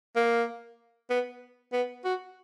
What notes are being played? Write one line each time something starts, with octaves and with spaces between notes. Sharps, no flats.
A#3
B3
B3
F#4